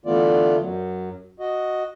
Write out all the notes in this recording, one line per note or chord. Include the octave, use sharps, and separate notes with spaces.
D3 E3 A3 B3 F4 D5
F#2 F#3
F#4 D#5